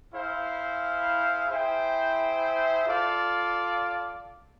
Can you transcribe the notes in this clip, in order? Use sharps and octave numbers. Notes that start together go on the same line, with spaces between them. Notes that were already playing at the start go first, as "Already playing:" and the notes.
E4 G#4 C5 F5
E4 G#4 C5 E5 G5
F4 A4 D5 F5